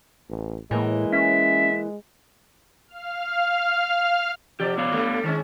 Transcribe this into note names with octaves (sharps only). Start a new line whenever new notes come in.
A1
A2 E3 G#3 A#3
C#4 E5
F5 F6
C3 F3 G4 D5
B3 C#5 F5
G2 G3 A3
D#3 G#3 C#4